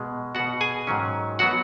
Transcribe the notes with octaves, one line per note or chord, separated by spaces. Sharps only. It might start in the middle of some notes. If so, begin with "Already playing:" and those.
Already playing: B2 G#3 B3
B2 B3 F#4 F#5
G#4 G#5
G#2 D#3 F#3 C#4
F#3 B3 F#4 F#5